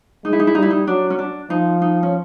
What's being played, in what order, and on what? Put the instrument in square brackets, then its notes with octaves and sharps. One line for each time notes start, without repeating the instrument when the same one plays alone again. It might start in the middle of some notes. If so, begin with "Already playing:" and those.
[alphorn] G#3 [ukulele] D#4
[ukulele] E4
D#4
E4
[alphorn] G3 [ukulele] D#4
[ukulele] E4
D#4
[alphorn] F#3 [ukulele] D4
[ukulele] C#4
D4
[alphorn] F3 [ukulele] D#4
[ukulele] D#4
C#4